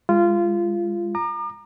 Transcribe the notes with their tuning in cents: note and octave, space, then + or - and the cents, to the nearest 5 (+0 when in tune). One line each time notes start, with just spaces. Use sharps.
G#3 -30 F4 -20
A#5 +0 D6 +45